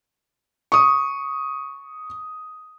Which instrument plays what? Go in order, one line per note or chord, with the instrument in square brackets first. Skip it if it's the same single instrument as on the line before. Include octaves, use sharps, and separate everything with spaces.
[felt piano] C#6 D#6